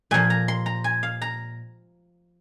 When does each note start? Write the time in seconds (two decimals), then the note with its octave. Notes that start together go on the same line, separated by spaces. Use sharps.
0.11 A#2 F3 A#3 G#5
0.30 A#5
0.48 C6
0.66 A#5
0.84 G#5
1.03 F5
1.22 A#5